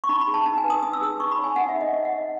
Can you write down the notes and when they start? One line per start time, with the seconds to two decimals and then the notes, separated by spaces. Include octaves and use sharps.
0.04 C#6
0.09 D#4 B5
0.21 B5
0.28 G#4
0.34 A5
0.46 D#4 A5
0.58 G#5
0.64 B4
0.70 D#6
0.83 D#4 D#6
0.93 E6
1.01 G#4 D#6
1.20 D#4 C#6
1.32 B5
1.39 C#5
1.44 G#5
1.56 D#4 F#5
1.69 E5
1.75 G#4
1.81 D#5
1.93 D#4 D#5
2.05 F#5
2.12 C#5
2.18 D#5